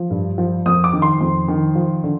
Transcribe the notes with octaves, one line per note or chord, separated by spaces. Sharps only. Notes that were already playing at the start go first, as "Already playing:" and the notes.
Already playing: F3
G2
F3
F2 D#6
D6
D#3
C6
F2
D#3
F3
D3